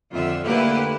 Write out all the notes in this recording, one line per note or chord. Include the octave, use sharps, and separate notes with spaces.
F2 D3 F4 E5
D3 A3 A#3 E4 G4 B4